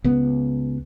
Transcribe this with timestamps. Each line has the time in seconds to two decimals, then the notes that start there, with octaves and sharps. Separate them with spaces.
0.04 C#2 B3